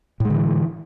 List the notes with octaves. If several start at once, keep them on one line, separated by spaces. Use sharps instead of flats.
A2 D3 E3 G#3